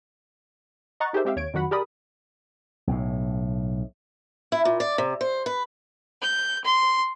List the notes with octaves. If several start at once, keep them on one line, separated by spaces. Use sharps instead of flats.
D#5 F#5 A#5 C#6 F#6 A6
D#4 G4 G#4 A#4 C5 E5
G#3 C4 G4 E5 F5 G5
D#2 C#5 G#6 D7
F2 D#3 F#3 F#4 F#5 B5
G4 G#4 A#4 D5 B5 D#6
B1 A2
E4
A#2
D5
C3
C5
B4
G6
C6